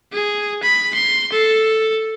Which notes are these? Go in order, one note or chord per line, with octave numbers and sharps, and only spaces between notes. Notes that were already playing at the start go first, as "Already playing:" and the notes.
G#4
B5
C6
A4